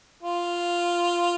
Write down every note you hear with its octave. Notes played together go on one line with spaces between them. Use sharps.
F4